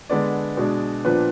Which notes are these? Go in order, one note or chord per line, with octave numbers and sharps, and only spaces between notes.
D3 G#3 B3 D4 D5
B2 G#3 D4
A#2 F3 B3 D4 B4